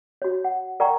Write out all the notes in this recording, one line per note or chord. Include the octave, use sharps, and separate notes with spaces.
F#4 C#5
F#5
A#4 D5 F#5 G5 A#5 C#6